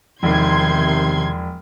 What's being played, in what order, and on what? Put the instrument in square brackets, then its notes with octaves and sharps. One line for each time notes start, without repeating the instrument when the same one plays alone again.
[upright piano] E1 [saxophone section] C3 D#3 [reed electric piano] F3 [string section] C6 G#6